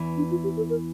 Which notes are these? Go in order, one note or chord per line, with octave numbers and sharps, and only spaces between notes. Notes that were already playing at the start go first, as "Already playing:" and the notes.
Already playing: E2 E3
D4
F4
G4
A4
A#4